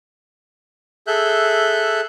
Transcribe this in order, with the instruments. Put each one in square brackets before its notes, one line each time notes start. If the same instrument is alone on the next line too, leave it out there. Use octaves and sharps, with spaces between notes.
[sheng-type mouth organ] G#4 A4 E5 F#6 G6